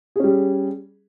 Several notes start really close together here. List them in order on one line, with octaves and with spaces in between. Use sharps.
G#4 C#4 G3